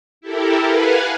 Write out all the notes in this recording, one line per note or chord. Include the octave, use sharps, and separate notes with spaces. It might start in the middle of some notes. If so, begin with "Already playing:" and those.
E4 G4 A4 A#4
B4 F5 F#5 G#5